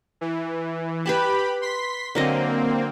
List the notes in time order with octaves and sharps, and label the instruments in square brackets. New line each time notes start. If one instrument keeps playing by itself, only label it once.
[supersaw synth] E3
[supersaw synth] G4 B5 [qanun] B4 G#5 A5
[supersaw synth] C6 B6
[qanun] D3 F#3 D#5 [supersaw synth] A#3 C4